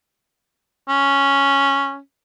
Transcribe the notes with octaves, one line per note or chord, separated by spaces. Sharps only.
C#4